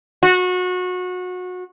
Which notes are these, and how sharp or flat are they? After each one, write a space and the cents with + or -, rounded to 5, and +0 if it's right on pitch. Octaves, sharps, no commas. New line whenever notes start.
F#4 -25